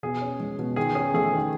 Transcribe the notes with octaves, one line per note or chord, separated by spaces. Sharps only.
B2 G#4
C#4
G#3
B2
D#3 G#4
C#4 G#4
A3 G#4
D#3